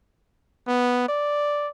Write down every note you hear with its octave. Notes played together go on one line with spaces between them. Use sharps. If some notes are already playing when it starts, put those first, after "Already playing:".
B3
D5